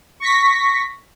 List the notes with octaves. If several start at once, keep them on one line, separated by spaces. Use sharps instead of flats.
C#6 A#6 B6